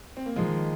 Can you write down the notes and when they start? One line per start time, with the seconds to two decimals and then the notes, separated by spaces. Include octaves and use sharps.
0.17 C4
0.26 A#3
0.36 D#3 F3 G#3